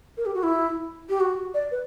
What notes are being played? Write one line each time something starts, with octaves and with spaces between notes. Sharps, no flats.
A#4
G4
F#4
E4
G4
F#4
D5
B4